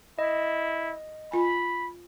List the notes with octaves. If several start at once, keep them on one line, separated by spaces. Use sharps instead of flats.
E4 D#5
F4 G#5 B5